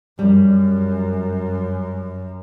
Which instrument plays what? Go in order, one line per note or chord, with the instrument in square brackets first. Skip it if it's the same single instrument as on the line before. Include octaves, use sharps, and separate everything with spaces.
[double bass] F#2 [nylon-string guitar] G3